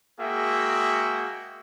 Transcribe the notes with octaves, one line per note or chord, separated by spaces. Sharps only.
G#3 A#3 F#4 G#4 E5 G5